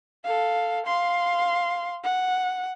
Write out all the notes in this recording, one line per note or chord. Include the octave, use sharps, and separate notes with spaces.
A4 F5
F5 C6
F#5